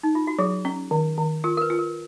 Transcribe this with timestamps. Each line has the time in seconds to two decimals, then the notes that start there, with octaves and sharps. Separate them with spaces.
0.03 D#4
0.15 F4
0.27 F#4
0.39 F#3 G#4
0.65 C#4
0.91 D#3
1.18 D#3
1.44 F4 A#4
1.57 A#4
1.62 B4
1.70 F4
1.79 A#4